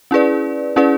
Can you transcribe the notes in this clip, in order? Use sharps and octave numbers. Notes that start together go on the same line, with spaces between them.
C#4 E4 G#4 B4 D5
C#4 E4 G#4 B4 D5